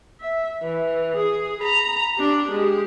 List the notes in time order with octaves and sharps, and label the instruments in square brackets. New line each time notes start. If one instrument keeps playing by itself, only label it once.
[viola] E5
E3
G#4
A#5 B5
D4 G4
G#3 G4